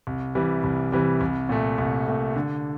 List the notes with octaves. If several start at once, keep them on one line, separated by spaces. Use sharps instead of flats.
C2
C3 E3 G3
C2
C3 E3 G3
C2
A#2 A3
C2
A#2 A3
D3